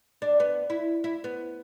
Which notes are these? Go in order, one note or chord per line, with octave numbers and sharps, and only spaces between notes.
D4
B3
E4
E4
B3